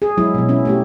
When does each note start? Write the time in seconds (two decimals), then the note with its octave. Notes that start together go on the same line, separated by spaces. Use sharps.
0.02 G#4
0.17 F#3 G#3 E4
0.34 B2 F#3
0.49 C#4 E4
0.65 A3 F#4 G4